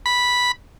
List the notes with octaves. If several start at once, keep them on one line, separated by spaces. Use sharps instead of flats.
B5